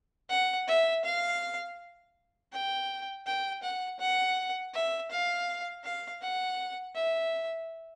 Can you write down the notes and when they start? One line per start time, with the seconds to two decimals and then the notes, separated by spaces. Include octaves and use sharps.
0.29 F#5
0.67 E5
1.04 F5
2.52 G5
3.26 G5
3.63 F#5
4.00 F#5
4.74 E5
5.11 F5
5.84 F5
6.22 F#5
6.95 E5